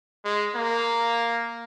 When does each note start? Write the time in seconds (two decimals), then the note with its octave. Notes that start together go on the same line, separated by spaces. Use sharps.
0.25 G#3
0.55 A#3